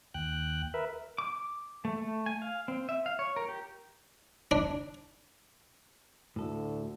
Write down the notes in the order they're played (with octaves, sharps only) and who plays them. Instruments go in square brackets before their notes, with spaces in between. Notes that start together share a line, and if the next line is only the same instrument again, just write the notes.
[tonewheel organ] D#2 G5 F#6
A#4 B4 E5
[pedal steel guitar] D6
A3
A3
G#5
F5
C4
E5
F5
C#5
A#4
G4
[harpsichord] D4
[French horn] D2 [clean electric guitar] A2 A4